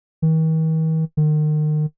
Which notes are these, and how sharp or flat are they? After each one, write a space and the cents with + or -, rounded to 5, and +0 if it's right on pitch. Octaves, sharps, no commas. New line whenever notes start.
D#3 +45
D#3 -35